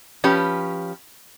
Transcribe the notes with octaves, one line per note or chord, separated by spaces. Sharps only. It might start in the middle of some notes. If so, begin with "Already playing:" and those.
F3 C#4 G4 B4